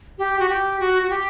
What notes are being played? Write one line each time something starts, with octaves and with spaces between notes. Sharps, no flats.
G4
F#4
G4
F#4
F#4
G4